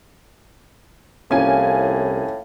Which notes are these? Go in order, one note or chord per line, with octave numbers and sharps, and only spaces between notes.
C2 A2 F3 A#3 C#4 G#5